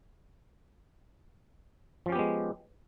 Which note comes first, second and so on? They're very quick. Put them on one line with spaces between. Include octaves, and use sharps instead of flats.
F3 C#4 G4 B3 G#3